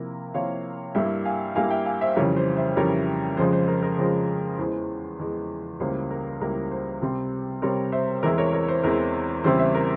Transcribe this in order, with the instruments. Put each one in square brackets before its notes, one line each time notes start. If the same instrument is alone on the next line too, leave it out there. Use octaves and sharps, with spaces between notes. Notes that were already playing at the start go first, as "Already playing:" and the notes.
Already playing: [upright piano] C3 F3 A#3 E4 A#4
C3 F3 A#3 E4 C#5 F5
G2 G3 A#3 E4 E5 G5
F5 G#5
G2 G3 A#3 E4 F5 G#5
E5 G5
F5 G#5
C5 E5
F2 C#3 E3 G3 A#4 C#5
C5
C5 E5
F2 C#3 E3 G3 A#4 C#5
F2 C#3 F3 G#3 C5
C5
A#4
A#4
F2 C#3 F3 G#3 C5
E2 E3 G#3 C5
E2 E3 G#3
C#2 C#3 G3 A#3 E4 C5
A#4
C#2 C#3 G3 A#3 E4 A#4
C5
C3 G3 C4
C3 G3 C4 A#4 C#5
C5 E5
E2 E3 G#3 C4 E4 A#4
A#4 C#5
A#4 C#5
C5
E2 E3 G#3 C4 E4 A#4
E2 C#3 G3 C4 E4 C5
C5 E5
A#4